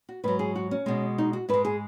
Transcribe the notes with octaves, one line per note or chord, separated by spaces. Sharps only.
F#4
G#2 F#3 B4
G#4
F#4
C#4
B2 G#3
D#4
F#4
G#2 G#3 B4
G#4